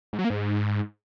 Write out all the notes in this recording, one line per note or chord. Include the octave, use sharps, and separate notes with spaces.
G#2
F#3
A#3
G#2